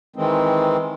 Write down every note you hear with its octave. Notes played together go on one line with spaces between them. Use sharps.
D#3 E3 G#3 C4